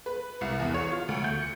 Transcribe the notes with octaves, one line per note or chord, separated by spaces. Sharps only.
B4
C2
E2
C#5
F4
D2
G6
C#7